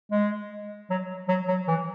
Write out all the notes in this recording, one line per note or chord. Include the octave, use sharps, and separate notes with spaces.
G#3
F#3
F#3
F#3
E3